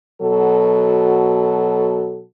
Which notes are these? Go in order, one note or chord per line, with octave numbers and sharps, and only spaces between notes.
B2 F#3 F#4 A4